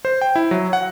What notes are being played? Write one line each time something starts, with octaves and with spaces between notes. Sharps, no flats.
C5
G5
E4
F#3
F#5